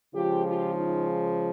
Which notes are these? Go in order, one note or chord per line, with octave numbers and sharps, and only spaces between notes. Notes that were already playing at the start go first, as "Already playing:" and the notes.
C#3 F3 G#3 F4 G4
F4 G4
D#4 F4